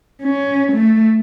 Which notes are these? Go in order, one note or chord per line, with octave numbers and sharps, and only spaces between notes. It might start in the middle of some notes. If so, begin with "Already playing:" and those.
C#4
A3